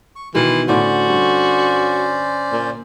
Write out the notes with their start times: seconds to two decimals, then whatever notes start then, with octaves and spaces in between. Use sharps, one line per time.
0.16 C#6
0.35 B2 D#3 E3 G#3 C6
0.68 A2 D3 C#4 F#4 C5 D5
1.08 G2
2.52 A#2